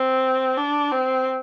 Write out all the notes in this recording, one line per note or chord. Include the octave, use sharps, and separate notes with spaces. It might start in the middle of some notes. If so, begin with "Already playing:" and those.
Already playing: C4
D4
C4